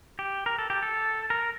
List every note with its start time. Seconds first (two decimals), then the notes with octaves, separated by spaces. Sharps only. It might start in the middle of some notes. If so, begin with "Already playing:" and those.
0.19 G4
0.46 A#4
0.59 A4
0.70 G4
0.83 A4
1.30 A#4